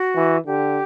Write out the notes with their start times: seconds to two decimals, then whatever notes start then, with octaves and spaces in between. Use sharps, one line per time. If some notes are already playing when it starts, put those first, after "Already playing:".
Already playing: F#4
0.16 E3
0.47 D3 G4